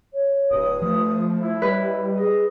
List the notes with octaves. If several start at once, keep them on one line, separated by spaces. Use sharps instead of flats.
C#5
D1 G2 D#6
F3 A3
A3 E4
G3 B4 D#5
G#4 D#5